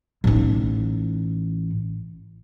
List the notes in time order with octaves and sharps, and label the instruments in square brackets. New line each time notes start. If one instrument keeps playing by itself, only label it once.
[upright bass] A1 D#4